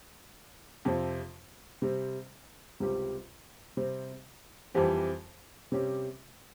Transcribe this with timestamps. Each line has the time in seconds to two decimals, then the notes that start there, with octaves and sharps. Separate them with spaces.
0.85 F2 C3 F3
1.82 C3 G3 C4
2.80 C#2 C3 G3 C4 G4
3.77 C3 G3 C4
4.74 F2 E3 G3 C4 G4
5.72 C3 G3 C#4 G4